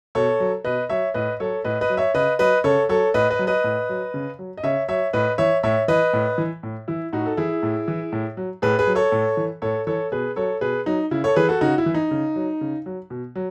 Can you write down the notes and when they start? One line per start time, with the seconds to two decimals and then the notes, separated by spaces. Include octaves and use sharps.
0.15 B2 A4 C#5
0.40 F#3
0.64 B2 B4 D#5
0.90 F#3 C#5 E5
1.14 A2 B4 D#5
1.40 F#3 A4 C#5
1.64 A2 B4 D#5
1.81 B4 D#5
1.90 F#3
1.97 C#5 E5
2.14 C#3 B4 D#5
2.39 F#3 B4 D#5
2.64 C#3 A4 C#5
2.89 F#3 A4 C#5
3.14 A2 B4 D#5
3.30 B4 D#5
3.39 F#3
3.47 B4 D#5
3.64 A2
3.89 F#3
4.14 C#3
4.39 F#3
4.57 D#5
4.64 C#3 C#5 E5
4.88 F#3 C#5 E5
5.13 A2 B4 D#5
5.38 E3 C#5 E5
5.63 A2 C#5 E5
5.88 E3 B4 D#5
6.13 A2
6.38 E3
6.63 A2
6.88 E3 E4
7.13 A2 D#4 F#4
7.26 A4
7.37 E3 E4 G#4
7.63 A2
7.88 E3
8.12 A2
8.37 F#3
8.62 A2 G#4 B4
8.79 G#4 B4
8.87 F#3
8.95 A4 C#5
9.12 A2
9.37 E3
9.62 A2 A4 C#5
9.87 E3 A4 C#5
10.12 B2 G#4 B4
10.36 F#3 A4 C#5
10.61 B2 G#4 B4
10.86 F#3 D#4
11.11 C#3 E4
11.24 A4 C#5
11.36 E3 G#4 B4
11.48 F#4 A4
11.61 C#3 D#4 F#4
11.78 E4
11.86 E3
11.94 D#4
12.11 C#3
12.36 F#3
12.61 C#3
12.86 F#3
13.10 B2
13.36 F#3